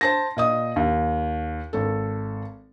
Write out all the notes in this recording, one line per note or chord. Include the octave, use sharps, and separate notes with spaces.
C5 A5 A#6
A#2 D#5 D#6
D#2
G#1 A4